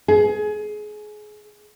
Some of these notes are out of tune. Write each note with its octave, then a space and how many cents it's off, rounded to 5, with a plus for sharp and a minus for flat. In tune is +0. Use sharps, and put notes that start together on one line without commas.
G#4 +25